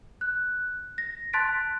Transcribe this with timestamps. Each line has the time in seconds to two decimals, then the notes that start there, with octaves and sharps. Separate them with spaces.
0.21 F#6
0.98 A#6
1.33 A5 C6 F#6 A6 B6 D7